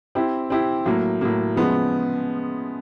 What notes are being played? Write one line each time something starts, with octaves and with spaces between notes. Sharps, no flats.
C4 E4 G4
C4 E4 G4
A2 F#3 A#3
A2 F#3 A#3
C#3 F3 G#3 B3